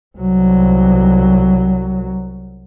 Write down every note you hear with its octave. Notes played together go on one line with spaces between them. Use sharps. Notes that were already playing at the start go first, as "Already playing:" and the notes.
C2 F#3